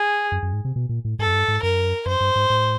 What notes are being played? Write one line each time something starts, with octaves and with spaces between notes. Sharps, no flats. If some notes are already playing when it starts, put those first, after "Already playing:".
Already playing: G#4
F#2
F#2
G#2
C3
B2
A#2
A2
G#2 A4
F#2
G2
G#2
F#2 A#4
F#2 C5
G2
G#2
A2